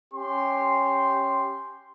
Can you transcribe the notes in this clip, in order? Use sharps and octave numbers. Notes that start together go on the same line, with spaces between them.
C#4 G4 C6